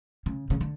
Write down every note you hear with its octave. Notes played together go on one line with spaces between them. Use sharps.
C#3
C#3
D3